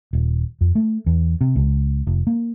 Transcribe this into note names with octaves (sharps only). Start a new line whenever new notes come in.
D#1
F2
A3
E2
C3
C#2
F1
A#3